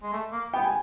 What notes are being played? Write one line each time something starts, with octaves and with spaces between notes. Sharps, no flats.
G#3
A3
A#3
B3 G5
G#5